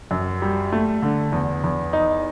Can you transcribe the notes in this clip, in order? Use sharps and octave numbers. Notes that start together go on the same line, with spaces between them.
F#2
G3
A3
D3
E2
E2
D#4